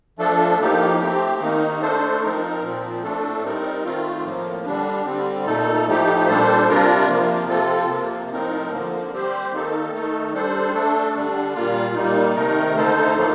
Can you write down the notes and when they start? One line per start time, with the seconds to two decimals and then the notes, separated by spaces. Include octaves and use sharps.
0.19 F3 A3 D4 A4
0.59 A2 F3 A#3 D#4 G4
1.00 A3 C4 G4
1.41 D#3 A#3 D#4
1.82 A3 D4 A4 C5
2.22 F3 C4 D#4 A#4
2.62 A#2 F3 C4
3.03 A2 A3 D4 A4
3.44 G3 C4 D#4 A#4
3.84 D#3 A3 C4 F4
4.24 A2 F3 A#3
4.65 D3 G3 D4
5.06 D3 G3 C4
5.46 A#2 A3 D#4 A4
5.87 A2 F3 A3 D#4 G4
6.27 A#2 G3 D4 A4 C5
6.68 C3 G3 D4 F4 A#4
7.09 C3 F3 A#3
7.49 C3 F3 C4 F4 A4
7.90 C3 F3 A#3
8.31 A2 F3 C4 D#4 A#4
8.71 D3 F3 A#3
9.12 G3 C4 G4 C5
9.52 D#3 A#3 D#4 A4
9.92 D#3 A3 D#4 A4
10.33 G3 D4 A4 C5
10.74 A3 D4 A4
11.14 D3 G3 D4
11.54 A#2 G3 A#3 F4
11.95 A#2 G3 A#3 D#4
12.36 C3 D#3 A3 D#4 A#4
12.76 D3 A3 D#4 A4 C5
13.17 A2 F3 A#3 D#4